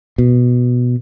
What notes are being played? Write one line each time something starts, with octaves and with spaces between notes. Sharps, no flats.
B2